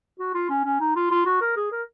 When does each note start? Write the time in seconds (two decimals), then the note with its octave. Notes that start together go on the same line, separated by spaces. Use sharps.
0.19 F#4
0.35 F4
0.50 C#4
0.65 C#4
0.80 D#4
0.96 F4
1.11 F4
1.26 F#4
1.41 A#4
1.56 G#4
1.72 A#4